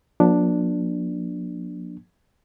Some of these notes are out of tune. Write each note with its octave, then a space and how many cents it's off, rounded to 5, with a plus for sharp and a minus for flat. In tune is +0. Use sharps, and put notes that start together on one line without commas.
F3 +45 A#3 +35 D4 +0